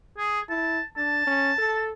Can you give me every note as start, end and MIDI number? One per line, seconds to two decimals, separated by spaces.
0.18 0.40 68
0.49 0.79 64
0.49 0.83 81
0.97 1.23 62
0.97 1.91 81
1.27 1.52 61
1.58 1.92 69